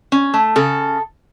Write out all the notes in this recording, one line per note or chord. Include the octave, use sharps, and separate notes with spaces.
C#4
A3
C#3 A4